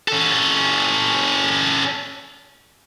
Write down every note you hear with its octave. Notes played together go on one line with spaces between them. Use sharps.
C#4 A4